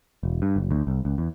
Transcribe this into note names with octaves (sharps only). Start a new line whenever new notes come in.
E1
G2
F#1
D2
C2
C#2
E2